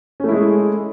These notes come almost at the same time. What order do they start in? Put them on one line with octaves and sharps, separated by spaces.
C#4 A3 E4 G#3 G#4